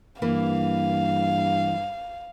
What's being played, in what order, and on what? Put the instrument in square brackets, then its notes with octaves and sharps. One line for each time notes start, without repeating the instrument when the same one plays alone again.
[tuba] G2 [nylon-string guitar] E3 A#3 [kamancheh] F5